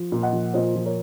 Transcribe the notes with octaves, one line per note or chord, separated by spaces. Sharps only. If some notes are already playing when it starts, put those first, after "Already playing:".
Already playing: F3
A#2
D#5 F#5
F3
A#2 C5 D#5
F3
A#4 C#5